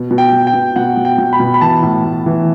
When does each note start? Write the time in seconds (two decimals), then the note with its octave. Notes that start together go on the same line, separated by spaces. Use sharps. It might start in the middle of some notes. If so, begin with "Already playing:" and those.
Already playing: B2
0.11 B2
0.18 G5
0.33 B2
0.47 G5
0.54 B2
0.76 B2 F#5
0.97 B2
1.05 G5
1.18 B2
1.33 B5
1.40 B2
1.54 B5
1.61 E3 A5
1.83 A2
2.05 A2
2.26 E3